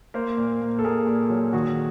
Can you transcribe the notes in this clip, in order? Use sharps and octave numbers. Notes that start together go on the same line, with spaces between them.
A#3 A#4 C5
A#2
A#2
A4
A#2 G#4 A#4
A#2
F#3
D#3 F#4 G#4